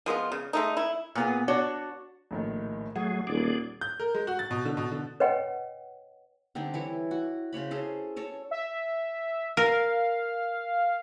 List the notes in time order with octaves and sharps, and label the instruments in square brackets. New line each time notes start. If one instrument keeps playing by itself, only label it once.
[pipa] F3 G#3 B3 F4
C#3
G#3 A3 D#4
E4
[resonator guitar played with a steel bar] A#2 B3 G#4
D4 F#4 C#5
[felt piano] A#1 A2 D#3
[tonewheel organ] F#3 A3 G#4 [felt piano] F#5
[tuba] D#1 [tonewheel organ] G#4 D5
[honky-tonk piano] G6
A#4
G#3
F#4
A6
B2
D3
B2
D3
[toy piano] B4 C#5 D#5 F#5 G5
[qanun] D3 G3 C4 D#4
E3 E4 C#5
F#4
C#3 C5 C#5 B5
C#4 G#4 A4 C5
A4 C#5 A5
[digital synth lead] E5
[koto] A#4 [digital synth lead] F5